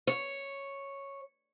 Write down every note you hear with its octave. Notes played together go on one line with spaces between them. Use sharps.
C#5